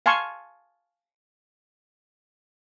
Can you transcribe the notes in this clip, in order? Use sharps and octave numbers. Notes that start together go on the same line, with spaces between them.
F5 G#5 A5 C6 C#6